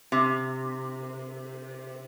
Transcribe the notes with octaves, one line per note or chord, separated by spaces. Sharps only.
C3